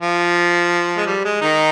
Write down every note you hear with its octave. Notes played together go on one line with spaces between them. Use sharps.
F3
G#3
G3
G#3
D#3 D#4